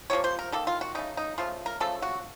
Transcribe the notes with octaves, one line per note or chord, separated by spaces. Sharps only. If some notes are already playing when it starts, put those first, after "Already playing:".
C3 F3 A#3 C#5
C5
A#4
D#3 A#3 A4
F4
F#4
C#3 A3 D#4
D#4
C#3 F3 A3 F4
A#4
C#3 F3 A3 A4
F#4